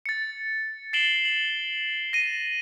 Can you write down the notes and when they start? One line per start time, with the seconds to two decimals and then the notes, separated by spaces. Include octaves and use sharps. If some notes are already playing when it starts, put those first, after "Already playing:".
0.06 A6 C#7
0.93 A6 C7 D7 E7 F#7 G7
1.25 F#7
2.13 A#6 D#7